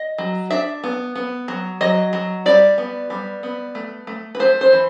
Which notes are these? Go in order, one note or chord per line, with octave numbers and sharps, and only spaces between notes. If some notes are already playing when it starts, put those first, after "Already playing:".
Already playing: D#5
F#3
D4 E5
B3
B3
F#3
F#3 D#5
F#3
G3 D5
B3
G3
B3
A3
A3
B4
A3 C5
C5
E3